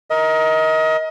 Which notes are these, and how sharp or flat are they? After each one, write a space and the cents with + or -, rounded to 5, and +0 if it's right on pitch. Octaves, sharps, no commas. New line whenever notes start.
A#4 +15 D#5 +30